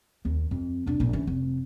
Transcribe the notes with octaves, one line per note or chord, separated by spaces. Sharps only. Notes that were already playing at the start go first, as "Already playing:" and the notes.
D#2
F2
E1 D4
A#1 A#2
E3 C#4
F1